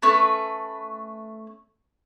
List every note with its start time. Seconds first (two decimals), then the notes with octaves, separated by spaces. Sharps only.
0.02 A3 C#4 B4